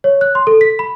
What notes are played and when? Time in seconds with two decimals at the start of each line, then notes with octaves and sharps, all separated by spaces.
0.04 C#5
0.21 F#6
0.35 C6
0.47 A4
0.61 B6
0.79 B5